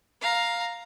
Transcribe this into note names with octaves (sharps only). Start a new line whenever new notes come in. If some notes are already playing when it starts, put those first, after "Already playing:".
F5 A#5